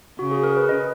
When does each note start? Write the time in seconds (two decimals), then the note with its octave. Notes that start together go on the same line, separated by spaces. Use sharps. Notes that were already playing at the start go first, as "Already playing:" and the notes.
0.19 C#3 F#4
0.31 G#4
0.43 A#4
0.57 B4
0.69 D#5